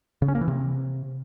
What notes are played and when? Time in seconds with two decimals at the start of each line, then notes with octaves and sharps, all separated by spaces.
0.22 C#3
0.28 C#4
0.35 A#3
0.41 E3
0.48 C3